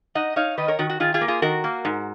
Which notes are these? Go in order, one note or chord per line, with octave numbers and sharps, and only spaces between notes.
D#4 D#5 F#5
D#4 C#5 F5
D#3 B4 D#5
A#4 C#5
D#3 F#4
F#4
D#3 F4 G#4
F4 G#4
A#3
F4 G#4
D#3 F#4 A#4
A#3
G#2